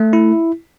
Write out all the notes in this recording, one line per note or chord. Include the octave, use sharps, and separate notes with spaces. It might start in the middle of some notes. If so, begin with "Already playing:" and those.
Already playing: A3
E4